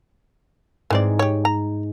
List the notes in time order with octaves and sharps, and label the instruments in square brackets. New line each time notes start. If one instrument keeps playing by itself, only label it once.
[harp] G#2 G#3 [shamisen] E3 C4 D5
[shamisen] G4 C#5
A#5